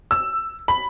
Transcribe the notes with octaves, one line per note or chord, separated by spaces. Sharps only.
E6
B5